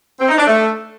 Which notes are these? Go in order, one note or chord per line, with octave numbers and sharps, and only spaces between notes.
C4
D#4
D4
A3